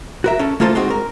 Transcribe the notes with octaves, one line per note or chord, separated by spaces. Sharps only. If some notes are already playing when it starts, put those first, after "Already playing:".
F#4 A#4 E5
C#4 A4
A3 A#3 F4 A4 C5
G#3 C4 D#4 F#4
A#4